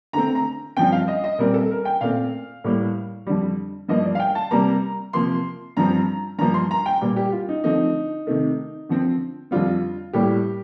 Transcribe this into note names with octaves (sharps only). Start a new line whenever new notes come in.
D3 A3 C4 A#5
A#5
G2 F3 C4 G5
F5
D#5
D#5
A#2 G3 C4 A#4
A4
A#4
G5
A#2 A3 C4 F5
A2 G3 A#3
F2 D3 G3
G2 F3 A#3 D#5
D5
F5
G5
A5
C3 G3 A#3 A#5
C3 F3 A#3 C6
G2 F3 C4 A#5
G2 F3 A#3 A#5
C6
A#5
G5
A#2 G3 A#3
G4
F4
D#4
D3 F3 A3 C4 D#4
C3 D#3 A3
D3 F3 C4
F2 D3 G3 C4 F4
A2 G3 A#3 G4